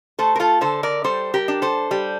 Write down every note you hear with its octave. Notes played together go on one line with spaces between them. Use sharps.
A3 A4 C5
A#4
F4 A4
D3 A4 C5
A#4 D5
G3 A4 C5
G4 A#4
D4
A4 C5
G3